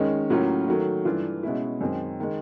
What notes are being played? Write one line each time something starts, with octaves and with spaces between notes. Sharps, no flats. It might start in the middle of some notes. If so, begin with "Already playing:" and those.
Already playing: D#3 G#3 C#4
A2 F#3 A#3 C#4 F4
D#3 F#3 A3
G2 E3 A3 D4 F4
B2 G#3 C#4 E4
F#2 D#3 G#3 C4
D#3 G#3